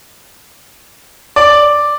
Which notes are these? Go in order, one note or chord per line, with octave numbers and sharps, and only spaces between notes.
D5